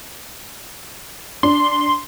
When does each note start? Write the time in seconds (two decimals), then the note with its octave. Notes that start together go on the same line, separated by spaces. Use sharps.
1.43 D4 C6